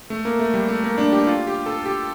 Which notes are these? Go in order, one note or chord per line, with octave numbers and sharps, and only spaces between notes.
A3
A#3
A3
G3
A3
A#3
D4
G4
F4
G4
A4
G4